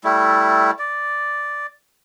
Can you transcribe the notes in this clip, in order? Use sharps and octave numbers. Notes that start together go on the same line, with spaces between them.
G3 A3 E4
D5